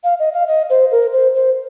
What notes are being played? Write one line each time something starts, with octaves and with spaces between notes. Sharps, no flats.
F5
D#5
F5
D#5
C5
A#4
C5
C5